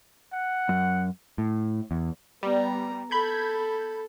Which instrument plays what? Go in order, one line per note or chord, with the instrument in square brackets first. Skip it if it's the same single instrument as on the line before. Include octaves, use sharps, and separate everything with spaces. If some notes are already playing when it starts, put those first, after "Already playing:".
[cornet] F#5
[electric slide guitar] F#2
[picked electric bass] A2
E2
[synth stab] G3 [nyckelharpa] B3 A#5
[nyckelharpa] A4 [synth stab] B5 G6 G#6